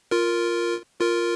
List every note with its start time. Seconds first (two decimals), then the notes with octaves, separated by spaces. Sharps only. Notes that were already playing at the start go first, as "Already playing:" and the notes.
0.11 F4 A#4
1.01 F4 A#4